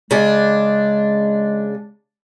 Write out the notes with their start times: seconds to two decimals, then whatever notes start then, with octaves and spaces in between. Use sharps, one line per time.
0.11 C#3 G#3 D4